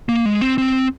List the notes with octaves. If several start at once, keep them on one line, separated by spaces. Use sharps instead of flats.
A#3
G#3
C4
C4